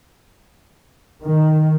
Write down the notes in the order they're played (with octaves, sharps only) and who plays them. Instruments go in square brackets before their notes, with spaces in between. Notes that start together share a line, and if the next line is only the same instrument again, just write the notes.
[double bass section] D#3